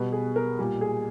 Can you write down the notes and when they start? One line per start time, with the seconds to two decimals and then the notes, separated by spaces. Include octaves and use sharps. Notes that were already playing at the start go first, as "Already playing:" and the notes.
Already playing: B2 G3 B4
0.13 G#4
0.36 A#4
0.59 A#2 G3
0.81 G#4